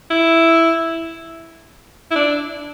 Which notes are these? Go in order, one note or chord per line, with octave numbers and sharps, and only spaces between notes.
E4
E4
D4